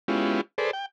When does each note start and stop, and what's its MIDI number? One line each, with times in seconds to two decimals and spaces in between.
0.08 0.41 56
0.08 0.41 59
0.08 0.41 61
0.08 0.41 64
0.08 0.41 65
0.08 0.41 67
0.58 0.71 68
0.58 0.71 69
0.58 0.71 71
0.58 0.71 72
0.58 0.71 74
0.73 0.86 79